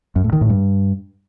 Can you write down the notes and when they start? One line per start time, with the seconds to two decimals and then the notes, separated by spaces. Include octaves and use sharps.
0.16 F#2
0.24 A2
0.33 D#3
0.41 A2
0.50 G2